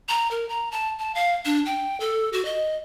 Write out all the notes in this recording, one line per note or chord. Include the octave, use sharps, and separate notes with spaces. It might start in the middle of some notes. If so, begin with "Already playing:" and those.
A#5
A#4
A#5
A5
A5
F5
D4
G5
A4
F#4
D#5